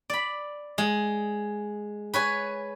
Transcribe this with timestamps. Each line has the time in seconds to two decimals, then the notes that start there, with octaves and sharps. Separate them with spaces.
0.10 D5 B5
0.78 G#3
2.14 B4 C#5 G#5